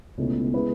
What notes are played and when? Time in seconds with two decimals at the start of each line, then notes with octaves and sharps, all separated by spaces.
0.18 C#2 B2 A3 C#4 E4
0.54 G#3 B3 E4 B4